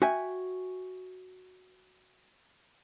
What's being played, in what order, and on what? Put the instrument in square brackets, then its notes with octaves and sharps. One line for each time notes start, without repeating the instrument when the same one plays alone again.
[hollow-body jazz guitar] F#4 E5 G5 G#5